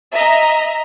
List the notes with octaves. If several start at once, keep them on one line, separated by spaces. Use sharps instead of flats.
D#5 E5 A#5